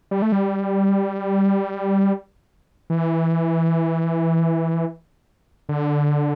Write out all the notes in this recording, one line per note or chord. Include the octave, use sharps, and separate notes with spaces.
G3
A3
G3
E3
D3